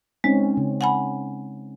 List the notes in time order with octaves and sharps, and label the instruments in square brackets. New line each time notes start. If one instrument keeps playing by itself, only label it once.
[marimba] G#3 [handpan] C4 C#4 D#4
[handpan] C#3
[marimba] F#5 G#5 B5